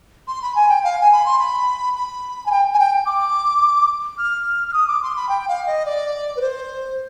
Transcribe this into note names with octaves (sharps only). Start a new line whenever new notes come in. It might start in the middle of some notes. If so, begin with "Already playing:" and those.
C6
B5
G#5
G5
F5
G#5
B5
C6
B5
B5
G#5
G5
G#5
G5
D6
F6
F6
D#6
D6
C6
B5
G5
F5
D#5
D5
B4
C5